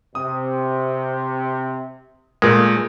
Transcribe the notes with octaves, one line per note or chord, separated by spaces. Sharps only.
C3 D#6
A#2 G#3 A3 A#4